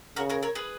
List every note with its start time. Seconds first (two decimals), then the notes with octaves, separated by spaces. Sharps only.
0.16 C#3 F#4 A#4
0.30 A#4 C#5
0.43 A#4 C#5
0.55 G#4 B4